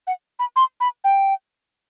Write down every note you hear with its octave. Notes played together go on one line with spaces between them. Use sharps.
F#5
B5
C6
B5
G5